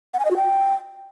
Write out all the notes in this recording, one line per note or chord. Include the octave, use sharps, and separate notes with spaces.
F#5
G#5
D#5
F#4
G5